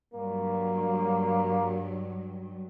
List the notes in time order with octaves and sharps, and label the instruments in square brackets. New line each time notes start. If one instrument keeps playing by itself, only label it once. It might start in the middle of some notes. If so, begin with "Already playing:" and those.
[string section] G2 F#3 [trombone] A#3